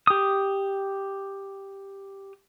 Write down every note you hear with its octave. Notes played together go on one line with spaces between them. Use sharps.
G4 D#6